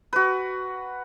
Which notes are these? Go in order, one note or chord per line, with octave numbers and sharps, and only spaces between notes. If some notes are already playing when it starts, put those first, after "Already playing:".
F#4 B4